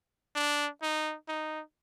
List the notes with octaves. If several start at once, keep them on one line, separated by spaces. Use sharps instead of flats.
D4
D#4
D#4